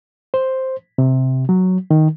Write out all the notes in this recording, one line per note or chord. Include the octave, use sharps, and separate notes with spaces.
C5
C3
F#3
D#3